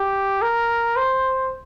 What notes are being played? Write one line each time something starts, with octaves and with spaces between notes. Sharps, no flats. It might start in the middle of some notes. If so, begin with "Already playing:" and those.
Already playing: G4
A#4
C5